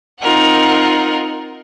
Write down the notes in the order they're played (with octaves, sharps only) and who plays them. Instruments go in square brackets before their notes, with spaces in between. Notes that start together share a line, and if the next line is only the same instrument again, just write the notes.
[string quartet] C4 D#4 F4 A#4 F#5